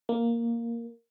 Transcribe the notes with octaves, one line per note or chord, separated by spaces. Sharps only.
A#3